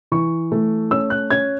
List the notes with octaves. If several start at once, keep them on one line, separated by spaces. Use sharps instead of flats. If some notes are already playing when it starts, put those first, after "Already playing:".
E3 C#6
A3
C#4 E6
F#6
C#4 G#6